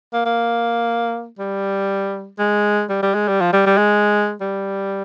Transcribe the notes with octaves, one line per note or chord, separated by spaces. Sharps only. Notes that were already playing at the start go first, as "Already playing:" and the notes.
A#3
A#3
G3
G#3
G3
G3
G#3
G3
F3
G3
G3
G#3
G3